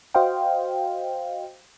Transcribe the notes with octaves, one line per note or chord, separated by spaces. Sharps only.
F#4 C5 D#5 F5 G5